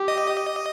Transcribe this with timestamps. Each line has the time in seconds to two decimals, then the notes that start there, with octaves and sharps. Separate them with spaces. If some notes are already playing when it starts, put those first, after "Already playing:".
Already playing: G4
0.08 D#5